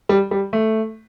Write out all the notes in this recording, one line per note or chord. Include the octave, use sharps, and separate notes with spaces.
G3
G3
A3